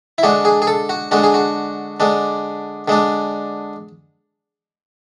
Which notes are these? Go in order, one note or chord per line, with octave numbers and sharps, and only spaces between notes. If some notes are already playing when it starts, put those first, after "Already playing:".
E4
D3 G#3 D4 F#4
G#4
G#4
A4
F#4
D3 G#3 D4 F#4
G#4
F#4
D3 G#3 D4
D3 G#3 D4